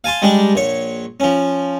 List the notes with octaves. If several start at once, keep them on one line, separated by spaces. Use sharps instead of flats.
F5 G#5 A5 C6
G3 G#3 D4 G4
A#1 C#5
F3 C#4